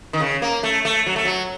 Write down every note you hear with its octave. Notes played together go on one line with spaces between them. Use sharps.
D#3
C#3
A#3
A3
A3
F#3
A3
F#3